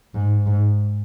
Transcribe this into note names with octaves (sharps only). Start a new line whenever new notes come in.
G#2
G#2